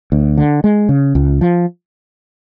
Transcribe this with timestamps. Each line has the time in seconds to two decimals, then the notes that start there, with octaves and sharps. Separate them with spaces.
0.12 D2
0.38 D3
0.64 G#3
0.89 C#3
1.15 C#2
1.41 F3